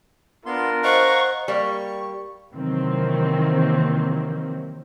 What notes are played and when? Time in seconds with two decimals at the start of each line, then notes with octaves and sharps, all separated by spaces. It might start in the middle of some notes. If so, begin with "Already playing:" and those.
0.46 B3 D4 F4 A#4 C6
0.84 C5 D#5 F5 F#5 A#5 C#6 F#6
1.48 G3 A#3 C#6
2.54 C3 D#3 E3 F#3 A#3 C4